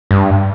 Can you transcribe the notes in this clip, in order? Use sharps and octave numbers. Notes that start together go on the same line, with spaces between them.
G2